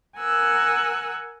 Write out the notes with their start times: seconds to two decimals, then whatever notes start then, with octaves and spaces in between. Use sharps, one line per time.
0.18 A#4 F#5 G#5 E6 F#6